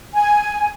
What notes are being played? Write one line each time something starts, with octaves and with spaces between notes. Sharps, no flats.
G#5